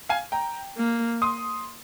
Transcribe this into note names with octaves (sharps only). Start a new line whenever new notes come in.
F5 G#5
G5 A#5
A#3
C6 D#6